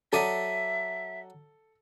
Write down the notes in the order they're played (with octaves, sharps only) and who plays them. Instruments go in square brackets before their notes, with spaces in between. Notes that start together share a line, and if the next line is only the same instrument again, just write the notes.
[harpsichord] F#3 D5 D#6 [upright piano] A4 [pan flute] E5